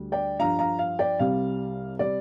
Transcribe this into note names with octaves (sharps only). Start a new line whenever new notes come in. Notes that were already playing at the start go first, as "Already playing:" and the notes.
Already playing: D2 D3 G3
D5 G5
G2 F3 F5 A#5
F5 A#5
F5
D5 G5
C2 C3 G3 F5
C3 G3 D5